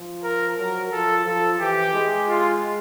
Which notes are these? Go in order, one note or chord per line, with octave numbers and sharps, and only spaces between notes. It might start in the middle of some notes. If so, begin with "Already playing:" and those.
Already playing: F3
A#4
F#3 A#4
F3 A4
F3 A4
E3 G4
G#3
F4